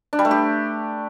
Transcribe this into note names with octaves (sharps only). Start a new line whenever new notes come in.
D4
G3
A3
G4